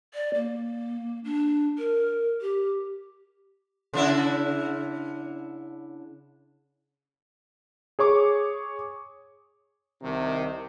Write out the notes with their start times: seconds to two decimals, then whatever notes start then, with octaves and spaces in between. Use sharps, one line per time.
0.14 D5
0.34 A#3
1.24 D4
1.78 A#4
2.41 G4
3.94 C#3 D4 E4
7.99 G#4 C#5 C#6 D6
10.02 C2 C3 D#3